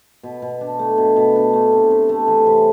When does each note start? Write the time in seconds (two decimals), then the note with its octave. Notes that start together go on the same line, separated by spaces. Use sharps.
0.23 B2
0.42 B2
0.61 D4
0.79 A3
0.98 B2
1.16 B2
1.36 D4
1.53 A3
1.73 C3
1.91 C3
2.09 A3
2.28 E3
2.47 C3